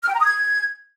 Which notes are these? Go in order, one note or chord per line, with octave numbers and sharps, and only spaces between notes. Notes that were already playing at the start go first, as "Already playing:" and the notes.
F6
G5
A#5
D#6
G#6